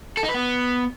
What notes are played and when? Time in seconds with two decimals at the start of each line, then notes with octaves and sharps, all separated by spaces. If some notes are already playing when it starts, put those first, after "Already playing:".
0.17 A4
0.23 D#4
0.29 B4
0.34 B3